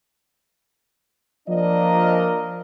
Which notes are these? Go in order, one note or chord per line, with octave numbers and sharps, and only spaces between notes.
F3 A#3 D4 A#4 D5 D#5